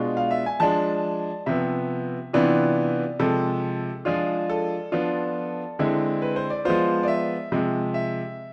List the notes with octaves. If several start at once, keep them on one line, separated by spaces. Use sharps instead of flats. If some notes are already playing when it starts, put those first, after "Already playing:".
Already playing: B2 G#3 D4 F4
F5
E5
G#5
F3 G#3 D4 A5
C3 F3 B3 E5
C3 E3 B3 D4 F4
C3 F3 G#3 A4
F3 G#3 D4 F4 G#4
A4
F3 B3 D4 F4
D3 G#3 C4 E4
B4
C5
D5
F3 G#3 B3 F4 C5
D5
E5
C3 F3 G#3
E5